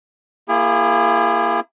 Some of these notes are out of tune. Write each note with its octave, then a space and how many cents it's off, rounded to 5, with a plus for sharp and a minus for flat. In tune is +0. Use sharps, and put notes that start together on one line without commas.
A#3 +0 E4 +25 G#4 -35